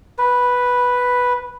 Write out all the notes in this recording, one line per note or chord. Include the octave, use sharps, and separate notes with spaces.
B4